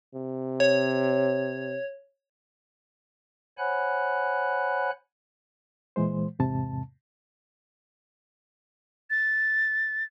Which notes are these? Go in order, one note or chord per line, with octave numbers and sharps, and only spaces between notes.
C3
C#5
C5 C#5 F#5 G#5 B5 F#6
A#2 E3 G#3 C5
E2 G#2 C3 A5
A6